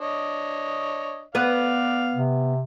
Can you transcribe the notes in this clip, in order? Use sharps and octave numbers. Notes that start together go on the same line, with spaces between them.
D4 C#5 D#5
B3 B4 D5 F5
C3